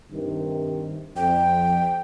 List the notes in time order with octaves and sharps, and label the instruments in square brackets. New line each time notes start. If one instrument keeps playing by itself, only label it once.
[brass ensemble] G2 C3 D#3
[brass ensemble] F2 [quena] G5